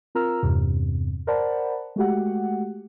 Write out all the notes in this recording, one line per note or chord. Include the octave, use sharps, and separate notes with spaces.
C4 F4 A#4 A#5 E6 F6
E2 G2 C3
A#4 C5 D5 F#5 A5 B5
G#3 A3 F#4 G4 F#5